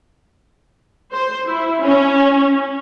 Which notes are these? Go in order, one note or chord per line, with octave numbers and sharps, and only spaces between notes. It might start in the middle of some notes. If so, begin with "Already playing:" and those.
C5
E4
C#4